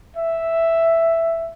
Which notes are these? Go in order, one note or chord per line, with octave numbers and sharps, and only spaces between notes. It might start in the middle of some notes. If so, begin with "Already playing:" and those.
E5